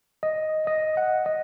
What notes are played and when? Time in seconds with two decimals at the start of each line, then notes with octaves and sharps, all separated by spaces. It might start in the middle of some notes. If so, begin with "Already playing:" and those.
0.23 D#5
0.67 D#5
0.97 F#5
1.26 D#5